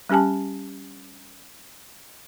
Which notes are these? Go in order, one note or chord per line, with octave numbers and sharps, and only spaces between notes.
G3 C#4 G4 G#5 A5